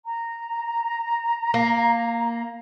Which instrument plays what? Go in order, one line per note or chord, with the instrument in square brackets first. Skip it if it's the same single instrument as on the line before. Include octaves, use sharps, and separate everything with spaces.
[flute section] A#5
[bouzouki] A#3